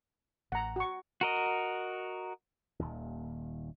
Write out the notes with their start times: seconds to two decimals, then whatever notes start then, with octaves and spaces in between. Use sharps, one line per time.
0.52 A1 F#5 A#5
0.76 F#4 C#6
1.21 F#4 A#4 D#5
2.79 D#1 D#2